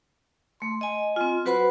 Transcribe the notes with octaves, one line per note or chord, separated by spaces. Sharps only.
A3 C6
D#5 G#5
C4 F4
F#3 F#4 B4 C5 F#5 B5